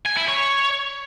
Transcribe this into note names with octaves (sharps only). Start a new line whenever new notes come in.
G#5
E4
C#5